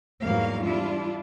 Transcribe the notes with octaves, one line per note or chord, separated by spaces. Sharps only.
E2 G#2 F#3 G3 A#3 F5
G3 D4 E4 F4